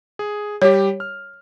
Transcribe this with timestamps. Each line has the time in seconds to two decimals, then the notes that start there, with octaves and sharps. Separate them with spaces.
0.19 G#4
0.62 G3 G4 C#5
1.00 F6